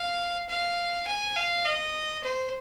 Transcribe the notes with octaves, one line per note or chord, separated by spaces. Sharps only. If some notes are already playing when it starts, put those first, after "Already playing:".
Already playing: F5
F5
G#5
F5
D#5
C5